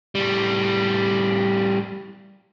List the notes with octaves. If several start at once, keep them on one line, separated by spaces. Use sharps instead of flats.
A2 G3